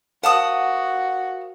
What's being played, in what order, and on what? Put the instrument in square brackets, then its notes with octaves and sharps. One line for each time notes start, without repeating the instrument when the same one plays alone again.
[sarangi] F#4 [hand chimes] A#4 C5 F5 [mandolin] F#5 A5 D#6